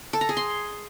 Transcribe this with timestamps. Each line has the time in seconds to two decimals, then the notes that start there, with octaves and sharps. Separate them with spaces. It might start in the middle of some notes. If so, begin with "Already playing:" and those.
0.13 A4
0.21 A#5
0.29 G#4
0.37 C6